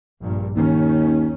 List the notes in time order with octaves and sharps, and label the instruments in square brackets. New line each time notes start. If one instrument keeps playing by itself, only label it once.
[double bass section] A#1 G2 A#2
[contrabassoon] D#2 [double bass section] D#3 C#4